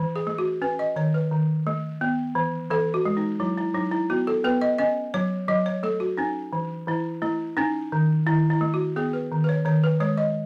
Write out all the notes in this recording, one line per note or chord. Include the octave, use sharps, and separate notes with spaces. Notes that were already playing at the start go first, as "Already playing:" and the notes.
Already playing: E3
G#4
A3
F#4
C#4 B4
D#5
D#3 C#5
B4
D#3
A3
B3
E3
E3 A4
F#4
G#3
D#4
F#3 E4
E4
F#3 D#4
E4
B3 F#4
A4
B3 B4
D#5
C#4 D#5
F#3 C#5
F#3 D#5
C#5
A3 A4
F#4
C#4 D#4
E3
E3 E4
A3 E4
C#4 D#4
D#3
D#3 E4
E4
A3
F#4
B3 G#4
B4
D#3
B4
C#5
D#3 C#5
B4
G#3 C#5
D#5